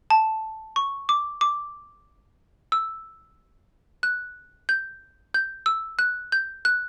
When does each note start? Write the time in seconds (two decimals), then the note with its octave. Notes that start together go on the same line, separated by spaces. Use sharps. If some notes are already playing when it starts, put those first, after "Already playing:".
0.10 A5
0.76 C#6
1.09 D6
1.41 D6
2.72 E6
4.03 F#6
4.69 G6
5.34 G6
5.66 E6
5.99 F#6
6.32 G6
6.65 F#6